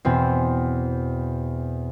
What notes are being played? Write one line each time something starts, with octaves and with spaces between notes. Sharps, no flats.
E2 B2 E3 C4